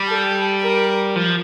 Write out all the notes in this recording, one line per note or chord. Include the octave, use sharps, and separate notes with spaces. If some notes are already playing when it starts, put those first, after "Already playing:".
Already playing: G3
A4
A#4
F3